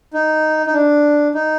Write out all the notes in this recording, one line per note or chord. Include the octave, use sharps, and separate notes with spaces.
D#4
D#4
D4
D#4